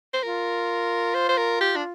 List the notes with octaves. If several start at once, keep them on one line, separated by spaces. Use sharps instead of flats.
C5
F4 A#4
C5
C5
A#4
G4
D4